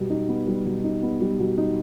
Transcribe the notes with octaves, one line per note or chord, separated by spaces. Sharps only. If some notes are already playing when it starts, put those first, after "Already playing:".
Already playing: B2 G3
D#4
B3
G3
B2
D#4
B3
G3
B2
D#4